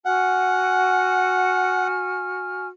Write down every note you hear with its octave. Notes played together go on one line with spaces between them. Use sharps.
F#4 F#5 G#5 F6